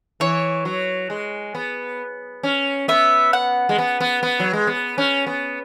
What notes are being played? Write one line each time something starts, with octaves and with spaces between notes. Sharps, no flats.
E3 C#5
F#3
G#3
B3
C#4
B3 E5
F#5
G#3
B3
B3
B3
F#3
G#3
B3
C#4
B3